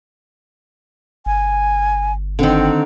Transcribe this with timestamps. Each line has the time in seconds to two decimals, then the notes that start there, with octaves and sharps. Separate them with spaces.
1.26 G1 G#5
2.39 D3 D#3 C4